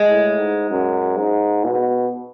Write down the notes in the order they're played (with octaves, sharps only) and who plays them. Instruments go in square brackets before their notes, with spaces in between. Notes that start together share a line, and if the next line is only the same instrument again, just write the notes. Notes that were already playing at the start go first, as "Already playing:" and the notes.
Already playing: [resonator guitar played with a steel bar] G#3
[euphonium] A2
G#2
F#2
G#2
B2